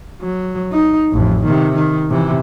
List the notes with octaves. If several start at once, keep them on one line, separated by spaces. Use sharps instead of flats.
F#3
D#4
A1 F2
C3 D#3
D#3
C3 E3